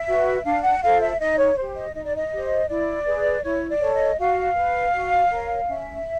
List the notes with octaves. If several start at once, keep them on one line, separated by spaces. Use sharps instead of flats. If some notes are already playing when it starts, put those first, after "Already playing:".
Already playing: E5
F#4 B4
D4 F5
F#5
F4 A4 C5 F5
E5
D#4 D#5
C#5
G4 C5
D#5
D#4 D#5
D5
D#5
G4 C5
E4 D5
G#4 B4
E4 C#5
D5
A4 C#5
D#5
F#4 F5
B4
F#4
A#4 C#5
C#4 E5